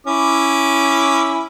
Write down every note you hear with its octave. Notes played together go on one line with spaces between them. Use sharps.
C#4 E4 D6